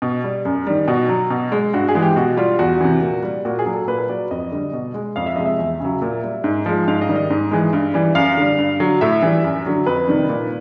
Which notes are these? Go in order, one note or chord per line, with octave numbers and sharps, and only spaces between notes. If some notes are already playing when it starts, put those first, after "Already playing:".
B2
G3
F#2
D#3 G3
B2 F#4
F#3
B2
G#3
G2 F#4
G#4
E3 G#3
G4
B2 F#4
G3 F4
E2 F#4
C3 E3
A#2
G3
A#2 F#4
G#4
F#3
A4
A#2 B4
F#3 D5
F2 D#5
D3 G3
B2
G#3
F2 F5
E5
C3 F3 G#3 D#5
E5
E2
C#3 F#3
A#2
G3
G#2
F3 G#3
G#2 F5
D#5
D#3 G3
D#5
G#2
E3 G#3
G2
E3 G3
F#2 F5
D3 G3
G2
D3 F#3
A2 E5
E3 G3
F#2
D3 F#3
F2 B4
C3 D#3 G3
A#2